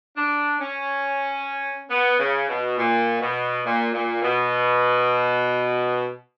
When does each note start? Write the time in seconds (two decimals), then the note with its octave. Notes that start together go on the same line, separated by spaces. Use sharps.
0.16 D4
0.61 C#4
1.90 B3
2.19 C#3
2.49 B2
2.78 A#2
3.20 B2
3.65 A#2
3.93 A#2
4.22 B2